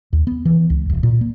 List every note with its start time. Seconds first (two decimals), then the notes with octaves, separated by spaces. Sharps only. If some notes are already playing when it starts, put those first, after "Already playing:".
0.13 D#2
0.27 B3
0.45 E3
0.70 C#2
0.89 D#1
1.03 A#2
1.21 A#3